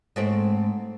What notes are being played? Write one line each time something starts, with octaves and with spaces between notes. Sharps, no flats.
G#2 A3 C4